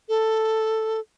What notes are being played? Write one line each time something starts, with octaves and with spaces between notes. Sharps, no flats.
A4